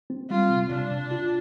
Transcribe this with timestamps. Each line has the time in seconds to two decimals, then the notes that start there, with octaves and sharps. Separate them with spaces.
0.10 C4
0.30 G3 F4
0.50 C3
0.70 C3 D4
0.90 C3
1.11 F4